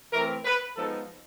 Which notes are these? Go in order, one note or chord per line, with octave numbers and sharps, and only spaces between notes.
E3 A3 C4 A#4
B4
F3 G#3 B3 D#4 A4